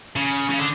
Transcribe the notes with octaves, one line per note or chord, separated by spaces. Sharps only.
C#3
C#3
D3